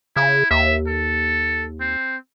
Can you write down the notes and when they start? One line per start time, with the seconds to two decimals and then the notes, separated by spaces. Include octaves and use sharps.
0.16 C#3 E4
0.51 D#2 E5
0.87 A4
1.81 C4